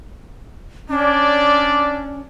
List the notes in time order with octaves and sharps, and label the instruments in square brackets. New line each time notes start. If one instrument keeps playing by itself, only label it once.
[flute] C#4 [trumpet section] D4 D5